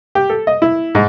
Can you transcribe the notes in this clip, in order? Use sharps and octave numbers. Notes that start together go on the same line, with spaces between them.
G4
A4
D#5
E4
G#2